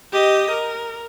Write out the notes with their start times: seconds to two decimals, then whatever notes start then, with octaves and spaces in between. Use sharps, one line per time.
0.13 G4 D#5
0.50 A#4